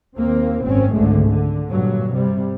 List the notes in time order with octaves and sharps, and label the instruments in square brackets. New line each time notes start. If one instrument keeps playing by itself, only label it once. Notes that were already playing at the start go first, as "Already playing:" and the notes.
[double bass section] D#2 A#3 C4
G#1 F#2 C4 C#4
G#1 C#2 D3 G#3 A3
D3
G2 A#2 F#3
C3 G3